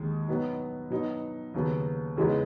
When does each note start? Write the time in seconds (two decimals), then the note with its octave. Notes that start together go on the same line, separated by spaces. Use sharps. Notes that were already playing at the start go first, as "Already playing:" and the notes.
Already playing: D#2 D#3 G#3
0.28 B2 F#3 B3 D#4
0.90 B2 F#3 B3 D#4
1.54 D#2 C#3 F#3 B3
2.17 E2 C#3 G#3 B3 D#4